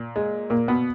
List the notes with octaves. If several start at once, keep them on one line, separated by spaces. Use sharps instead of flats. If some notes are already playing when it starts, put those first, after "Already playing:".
Already playing: A#2
G#3
A#2 A#3
B2 B3